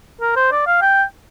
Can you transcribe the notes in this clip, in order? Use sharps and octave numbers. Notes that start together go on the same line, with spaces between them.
A#4
C5
D5
F5
G5